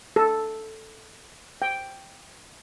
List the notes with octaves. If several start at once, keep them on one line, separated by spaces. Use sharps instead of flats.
A4
G5